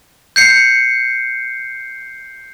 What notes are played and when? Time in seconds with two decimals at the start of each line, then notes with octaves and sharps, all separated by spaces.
0.36 G6 C7 C#7